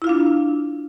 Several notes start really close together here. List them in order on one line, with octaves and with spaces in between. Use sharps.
E4 F4 F5 D4